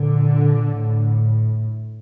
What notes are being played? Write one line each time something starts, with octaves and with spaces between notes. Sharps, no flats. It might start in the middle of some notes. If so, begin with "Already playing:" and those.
Already playing: A#2 D3
A2